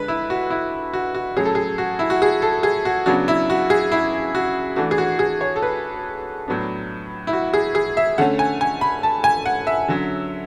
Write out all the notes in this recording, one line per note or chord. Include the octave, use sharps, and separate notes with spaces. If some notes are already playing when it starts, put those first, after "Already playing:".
Already playing: D3 G#3 D4 B4
E4
F#4
E4
F#4
F#4
A2 F#3 A3 C#4 G#4
A4
G#4
F#4
E4
F#4
G#4
A4
G#4
F#4
C#3 F#3 B3 D4 F#4
E4
F#4
G#4
E4
F#4
E3 A3 D4 F#4
G#4
F#4
G#4
C#5
A4
B4
A2 F#3 B3 D4
E4
F#4
G#4
G#4
E5
D3 A3 C#4 F#5
G#5
G#5
B5
A5
G#5
F#5
E5
D3 F#3 C#4